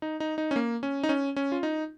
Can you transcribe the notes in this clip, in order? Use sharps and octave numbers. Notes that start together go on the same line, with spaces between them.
D#4
D#4
D#4
C#4
A#3
C#4
D#4
C#4
C#4
F4
D#4